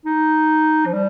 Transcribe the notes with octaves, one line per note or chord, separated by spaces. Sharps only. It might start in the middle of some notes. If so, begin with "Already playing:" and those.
D#4
F3
G3